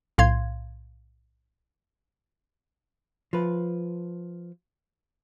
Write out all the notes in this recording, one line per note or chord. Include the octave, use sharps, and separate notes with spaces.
B1 A2 F5 C6 G#6
F3 B4